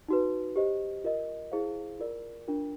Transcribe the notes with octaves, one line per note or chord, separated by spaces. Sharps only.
D#4 F#4 B4
G4 C5 D#5
F4 A#4 D#5
E4 G#4 C5 F5
F4 A#4 D5
D4 F4 A#4